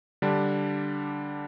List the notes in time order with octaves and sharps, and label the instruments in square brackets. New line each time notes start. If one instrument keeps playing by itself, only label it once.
[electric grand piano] D3 G3 D4